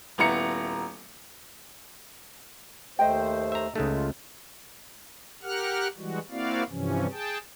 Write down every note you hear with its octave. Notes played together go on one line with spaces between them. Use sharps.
D#1 B3 E4 A#5 C#7
D#2 A3 C5 D#5 G5
E5 A#5
C#2 G#3 A3 D#4
F4
G4 A#4 F#5 F6 F#6
E3 G3 G#3 F#4
A#3 C4 E4 F#4 D5 F5
G2 C3 E3 F3 C#4
G#4 G5 A5